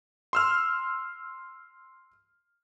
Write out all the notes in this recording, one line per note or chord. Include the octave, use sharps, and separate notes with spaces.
C6 E6 F6